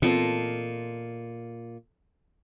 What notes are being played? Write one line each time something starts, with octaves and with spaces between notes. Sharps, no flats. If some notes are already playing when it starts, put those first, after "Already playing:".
A#2 E3 B3 C4 F4 A4 D#5